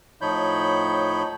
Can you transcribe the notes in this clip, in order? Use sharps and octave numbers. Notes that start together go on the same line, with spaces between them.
A2 F3 D#4 C#5 B5 G6